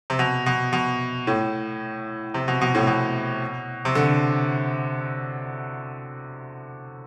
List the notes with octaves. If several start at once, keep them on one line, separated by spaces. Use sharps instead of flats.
C3
B2
B2
B2
A2
C3
B2
B2
A2
B2
C3
D3